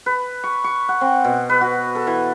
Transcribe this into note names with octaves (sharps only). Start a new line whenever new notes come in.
B4
C#6
C#6
F#5
C4
B2
B4
F#4
A4
E3